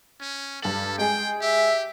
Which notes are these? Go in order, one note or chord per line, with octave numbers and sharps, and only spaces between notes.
C#4
G2 A4 F#7
G#3 G#4 G5
G4 E5